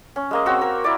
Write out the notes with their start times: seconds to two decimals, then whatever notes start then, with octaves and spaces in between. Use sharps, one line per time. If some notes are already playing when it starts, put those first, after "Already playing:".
0.16 C#4
0.31 G#3 A#3 D#5
0.46 C4 F#4 C#6 E6
0.61 A#4
0.84 E4 A#4 D5